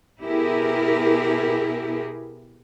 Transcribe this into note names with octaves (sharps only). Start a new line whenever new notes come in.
B2 B3 E4 G4 G#4 A#4